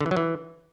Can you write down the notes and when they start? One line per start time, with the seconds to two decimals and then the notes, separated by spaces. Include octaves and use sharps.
0.01 D3
0.06 E3
0.11 F#3
0.17 E3